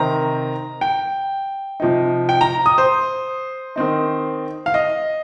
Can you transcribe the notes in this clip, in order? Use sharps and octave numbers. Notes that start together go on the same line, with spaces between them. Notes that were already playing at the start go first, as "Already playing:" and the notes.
Already playing: C3 D#3 C4 A#5
G5
C3 F3 D#4
G5
A#5
D#6
C5
D#3 C4 D#4
F5
D#5